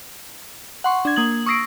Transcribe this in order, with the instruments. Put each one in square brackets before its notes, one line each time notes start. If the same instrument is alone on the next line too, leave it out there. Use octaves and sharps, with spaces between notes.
[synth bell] F#5 C6 C#6
D4 G#6
A#3 D#6 G#6 F#7
C#6 D#6 E6 A#6 C7 D7